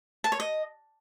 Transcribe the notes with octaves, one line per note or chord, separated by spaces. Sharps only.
A5
C#5
D#5